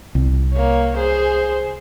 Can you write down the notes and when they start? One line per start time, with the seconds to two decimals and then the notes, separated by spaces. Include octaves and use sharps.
0.15 C2
0.54 A#3 C#5
0.97 G#4 C5